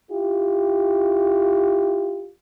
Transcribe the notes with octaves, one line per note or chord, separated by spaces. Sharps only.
E4 F4 G4